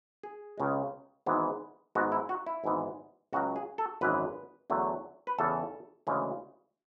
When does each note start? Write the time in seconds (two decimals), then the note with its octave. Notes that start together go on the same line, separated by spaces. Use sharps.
0.23 G#4
0.58 C#2 C#3 G#3
1.26 G#1 G#2 E3 G#3 B3
1.95 G#1 G#2 G#3 B3 F#4
2.12 E4
2.29 F#4
2.46 E4
2.64 G#1 G#2 E3 G#3 B3
3.33 C#2 C#3 F#3 F#4
3.56 G#4
3.78 A4
4.01 G#1 F#2 E3 G#3 B4
4.70 E2 D3 F#3 A3
5.27 B4
5.39 E2 C#3 E3 A4
6.07 D2 C#3 E3 G#3